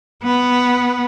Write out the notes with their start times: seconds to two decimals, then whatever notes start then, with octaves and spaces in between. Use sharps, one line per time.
0.23 B3